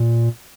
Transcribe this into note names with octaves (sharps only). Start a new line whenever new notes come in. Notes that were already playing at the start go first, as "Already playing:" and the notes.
Already playing: A#2